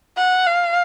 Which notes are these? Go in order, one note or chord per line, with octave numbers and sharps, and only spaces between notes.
F#5
F5